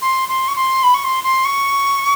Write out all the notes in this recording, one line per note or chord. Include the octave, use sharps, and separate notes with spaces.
C6
C6
C#6
C6
B5
C#6
C6
C6
C#6